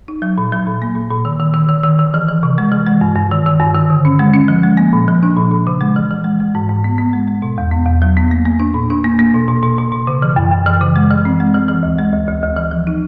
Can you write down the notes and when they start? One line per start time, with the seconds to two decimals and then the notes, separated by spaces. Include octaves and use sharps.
0.08 D#4
0.22 F#3
0.38 A#2
0.52 F#3
0.67 A#2
0.82 A#3
0.95 A#2
1.11 A#2
1.25 D#3
1.40 D#3
1.54 D#3
1.69 D#3
1.83 D#3
1.99 D#3
2.14 E3
2.28 E3
2.43 C3
2.58 G#3
2.72 E3
2.87 G#3
3.01 G2
3.16 G2
3.31 D#3
3.46 D#3
3.60 G2
3.75 D#3
3.90 D3
4.05 C#4
4.19 G#3
4.33 C#4
4.48 F3
4.63 G#3
4.77 A#3
4.93 A#2
5.08 F3
5.23 D4
5.36 A#2
5.51 A#2
5.67 C#3
5.81 G#3
5.96 E3
6.10 E3
6.24 G#3
6.40 G#3
6.55 G#2
6.69 G#2
6.84 B3
6.98 B3
7.13 G#3
7.27 G#3
7.42 B2
7.58 E2
7.71 B3
7.86 E2
8.02 F#3
8.17 B3
8.31 A#3
8.45 A#3
8.60 D4
8.74 A#2
8.90 D4
9.04 A#3
9.19 A#3
9.34 B2
9.48 B2
9.62 B2
9.78 B2
9.92 B2
10.07 C#3
10.22 E3
10.36 F#2
10.51 F#2
10.66 E3
10.81 C#3
10.96 G#3
11.11 E3
11.25 C4
11.40 G#3
11.54 E3
11.68 E3
11.83 D2
11.99 G#3
12.12 D2
12.27 D2
12.43 D2
12.57 E3
12.71 F3
12.87 D#4